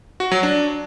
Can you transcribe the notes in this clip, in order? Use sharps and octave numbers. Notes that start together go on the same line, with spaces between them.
F#4
F#3
D4